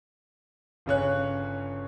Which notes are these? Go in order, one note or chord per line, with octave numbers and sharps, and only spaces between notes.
G1 C#3 C#4 F#6